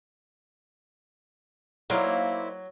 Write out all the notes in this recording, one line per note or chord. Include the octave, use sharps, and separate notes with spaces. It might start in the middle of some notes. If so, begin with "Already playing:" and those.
F#3 A#3 D#4 E4 C5 D5 F5